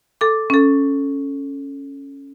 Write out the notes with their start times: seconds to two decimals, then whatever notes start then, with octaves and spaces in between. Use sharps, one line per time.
0.21 A4 D6
0.50 C#4 A4